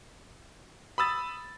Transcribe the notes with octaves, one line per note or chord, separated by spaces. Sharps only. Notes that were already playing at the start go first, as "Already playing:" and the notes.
B5 D#6 E6 A6